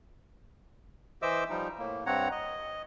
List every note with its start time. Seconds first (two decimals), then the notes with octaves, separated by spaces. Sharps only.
1.22 E3 C5 D#5 E5 D6 E6
1.50 F3 G3 D#4
1.79 A2 A#3
2.06 G2 C4 C#5 F#5 A#5
2.31 D#5